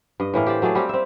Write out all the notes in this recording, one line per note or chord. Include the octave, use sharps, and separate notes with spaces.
G2 D#5
A2 E3 A#3
G4 C5 D5
F#3 A3 G#4 D5
G3 A#3 C4 G4
C4 E5